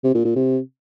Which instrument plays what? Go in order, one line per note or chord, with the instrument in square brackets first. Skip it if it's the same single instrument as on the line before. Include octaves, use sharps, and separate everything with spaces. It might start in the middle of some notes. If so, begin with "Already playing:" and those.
[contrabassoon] C3
A#2
A#2
C3